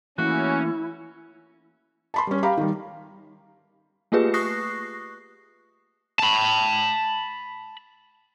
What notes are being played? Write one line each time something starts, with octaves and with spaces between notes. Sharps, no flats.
E3 A3 A#3 C#4 E4 F#4
A5 B5 C6
G3 C#4
G4 F5 A#5 B5
D#3 G3
A3 A#3 F4 G4 G#4 B4
C#6 D#6 F#6 A#6 C7
A5 B5